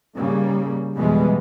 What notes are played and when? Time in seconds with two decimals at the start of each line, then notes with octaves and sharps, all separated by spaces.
0.16 G#2 C#3 G3 A#3
0.95 F2 B2 E3 G3 G#3 B3